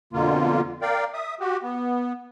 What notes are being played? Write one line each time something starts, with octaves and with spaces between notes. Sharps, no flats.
F2 B2 D3 A#3 F4
A#4 D5 F5 G5
E5 D#6
F#4 G4
B3